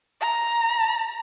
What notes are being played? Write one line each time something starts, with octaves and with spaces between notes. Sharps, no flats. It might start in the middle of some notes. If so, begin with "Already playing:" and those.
A#5